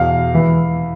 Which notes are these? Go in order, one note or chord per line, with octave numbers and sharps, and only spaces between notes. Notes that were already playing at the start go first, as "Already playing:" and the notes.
Already playing: E2 B2 F5
E3